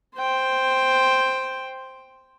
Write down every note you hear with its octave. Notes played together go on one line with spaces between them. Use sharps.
C5 G5